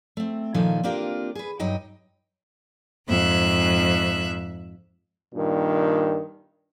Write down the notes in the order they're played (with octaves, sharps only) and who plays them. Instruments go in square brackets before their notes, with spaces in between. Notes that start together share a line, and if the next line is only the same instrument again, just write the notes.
[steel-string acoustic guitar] A3 C4
A#2 D#3 F3 A4 G#5
A#3 C4 D4 F4 G4 A#4
G#4 B4
G2 F#3 D#4 D#5 G5
[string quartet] F2 G#2 E5 F#6
[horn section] G2 A#2 D#3